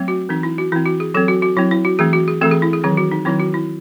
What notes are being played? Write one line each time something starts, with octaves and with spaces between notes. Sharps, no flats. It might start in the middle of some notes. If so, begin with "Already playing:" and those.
Already playing: F#3 A3 C4
F#4
E3 C4 D#4
E4
F#4
E3 C4 E4
F#4
G#4
F#3 C4 A4
F#4
F#4
F#3 C4 E4
E4
F#4
E3 A3 C4 G#4
F#4
G#4
E3 A3 C4 A4
G#4
E4
G#4
D#3 F#3 C4 G#4
F#4
D#4
D#3 F#3 C4 E4
F#4
E4